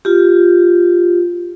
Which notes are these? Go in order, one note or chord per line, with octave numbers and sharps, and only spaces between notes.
F4 G4